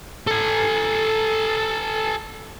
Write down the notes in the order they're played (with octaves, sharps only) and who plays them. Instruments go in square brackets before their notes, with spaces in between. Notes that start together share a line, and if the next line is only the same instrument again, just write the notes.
[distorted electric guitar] A4 G#5